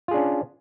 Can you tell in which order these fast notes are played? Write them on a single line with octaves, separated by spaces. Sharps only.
F4 G#4 D4 C#4